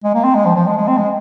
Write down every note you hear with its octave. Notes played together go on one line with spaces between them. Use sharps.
G#3
A#3
C4
G#3
F3
F3
G#3
G#3
C4
G#3